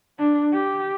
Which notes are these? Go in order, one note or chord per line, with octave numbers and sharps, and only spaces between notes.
D4
G4